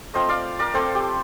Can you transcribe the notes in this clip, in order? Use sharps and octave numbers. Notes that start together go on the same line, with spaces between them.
A3 C4 F4 C5 D#5
D5 F5
A#4 D5
A3 C4 F4 A4 C5
G4